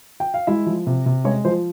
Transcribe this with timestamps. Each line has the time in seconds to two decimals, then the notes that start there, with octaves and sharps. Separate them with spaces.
0.20 G5
0.34 F5
0.47 G#3 E4 E5
0.66 F3
0.87 C3
1.06 C3
1.24 G#3 C#4 C#5
1.45 F3 C5